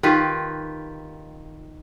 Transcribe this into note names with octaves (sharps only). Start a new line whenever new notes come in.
D#3 F4 G4 B4